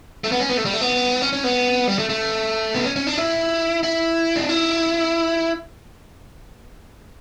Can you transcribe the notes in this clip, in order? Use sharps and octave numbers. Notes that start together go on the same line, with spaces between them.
A3
B3
C#4
B3
A3
G3
A3
B3
C#4
C#4
B3
G3
A3
A3
B3
C#4
C#4
D4
E4
E4
D4
E4